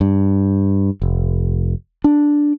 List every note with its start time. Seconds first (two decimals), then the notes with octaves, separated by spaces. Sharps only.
0.01 G2
1.02 F1
2.04 D4